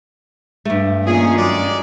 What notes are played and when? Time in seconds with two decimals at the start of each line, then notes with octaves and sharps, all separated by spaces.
0.65 G2 A3
1.07 A#2 D#3 C#4 G#4
1.37 F#2 G#3 D5